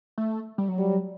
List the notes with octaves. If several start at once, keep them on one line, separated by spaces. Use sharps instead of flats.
A3
G3
F#3
G3